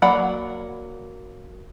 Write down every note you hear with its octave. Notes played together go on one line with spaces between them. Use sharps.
F#3 A#3 D5 F#5 B5